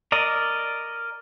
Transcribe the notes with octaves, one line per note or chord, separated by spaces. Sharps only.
A#4 D5 D#5